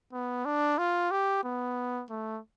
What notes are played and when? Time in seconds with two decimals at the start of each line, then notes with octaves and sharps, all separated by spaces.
0.13 B3
0.45 D4
0.78 F4
1.11 G4
1.44 B3
2.10 A3